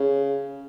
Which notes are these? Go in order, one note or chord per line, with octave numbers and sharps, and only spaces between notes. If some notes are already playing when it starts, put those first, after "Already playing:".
Already playing: C#3